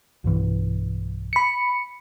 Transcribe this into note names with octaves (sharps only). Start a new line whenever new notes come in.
B1 G2 E3
B5 C#7